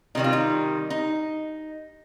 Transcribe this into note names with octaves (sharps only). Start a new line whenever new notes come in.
C3 D#3 G3 D#4
F4
D#4
D#4